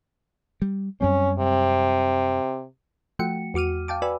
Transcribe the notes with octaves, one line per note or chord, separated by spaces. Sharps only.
G3
F#2 G3 C4 C#4
C3
F3 A3 F#4 F#5 G5 C#7
E2 F#4 D6 F6 D#7
F5 G5 A5 D6
F#4 B4 D5 G#5 B5 E6